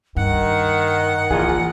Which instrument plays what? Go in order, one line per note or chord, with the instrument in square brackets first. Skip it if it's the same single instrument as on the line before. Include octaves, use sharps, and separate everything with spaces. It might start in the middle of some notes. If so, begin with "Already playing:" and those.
[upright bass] G2 [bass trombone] D#3 [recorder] F#5
[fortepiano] A#1 F4 G#4 [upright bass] E3